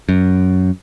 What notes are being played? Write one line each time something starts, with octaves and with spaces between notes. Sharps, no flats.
F#2